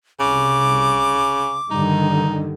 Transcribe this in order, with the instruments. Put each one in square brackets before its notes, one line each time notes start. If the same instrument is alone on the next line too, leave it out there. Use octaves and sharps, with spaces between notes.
[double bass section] C2 [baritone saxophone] C#3 [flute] D6
[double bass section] G2 D3 D#3 [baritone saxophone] D#4